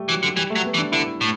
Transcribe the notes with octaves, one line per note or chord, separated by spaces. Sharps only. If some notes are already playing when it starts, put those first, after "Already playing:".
Already playing: G3 A3
E3 F#3
D3
E3 G3
A3
F#3
B3
E3
D4
D3 E4
A2